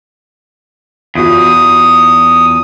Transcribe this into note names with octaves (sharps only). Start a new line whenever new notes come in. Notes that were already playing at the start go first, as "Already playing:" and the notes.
E2 F4 F#4 D#6